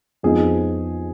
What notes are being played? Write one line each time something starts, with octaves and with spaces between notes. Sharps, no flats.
F2 F3 B3 D#4 G#4